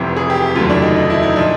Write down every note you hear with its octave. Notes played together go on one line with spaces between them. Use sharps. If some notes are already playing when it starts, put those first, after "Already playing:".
Already playing: F1 F2 C3 E3
G#4
G4
G4
F1 D#2 C#3 F#3 A3 F4
D4
D#4
D#4
E4
D#4
A#2 F3 D4